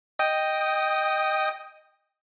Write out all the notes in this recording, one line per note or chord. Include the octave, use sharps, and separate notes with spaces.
D#5 G5 D#6